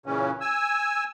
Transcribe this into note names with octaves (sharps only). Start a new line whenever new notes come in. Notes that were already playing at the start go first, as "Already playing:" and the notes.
A#2 C#3 E3 C#4
G#5 E6